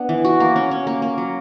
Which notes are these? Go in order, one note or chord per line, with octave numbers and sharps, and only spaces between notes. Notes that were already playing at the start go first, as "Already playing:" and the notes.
Already playing: B3 D4
E3
F#4
A#3
C#4
C#4
A#3
A#3
F#3